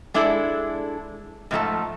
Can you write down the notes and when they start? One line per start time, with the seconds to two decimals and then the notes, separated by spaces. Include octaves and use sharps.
0.14 G#3 D4 E4 A4 D5
1.51 G#2 F3 A3 A5